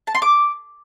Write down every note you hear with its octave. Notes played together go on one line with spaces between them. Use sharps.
A5
C6
D6